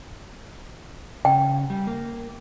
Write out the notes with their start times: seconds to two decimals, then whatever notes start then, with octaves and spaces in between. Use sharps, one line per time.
1.25 C#3 G5
1.70 G3
1.87 A#3